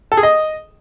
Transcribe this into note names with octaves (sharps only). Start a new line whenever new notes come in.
A4
G#4
D#5